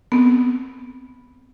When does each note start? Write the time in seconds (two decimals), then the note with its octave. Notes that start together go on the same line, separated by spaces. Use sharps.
0.12 B3 C4